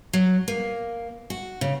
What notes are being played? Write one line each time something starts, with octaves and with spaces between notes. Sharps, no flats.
F#3
A#3
F#4
C#3